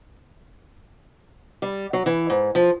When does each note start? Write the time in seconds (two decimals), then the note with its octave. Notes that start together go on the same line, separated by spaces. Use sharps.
1.62 G3
1.93 F#3
2.06 E3
2.30 G#2
2.55 F3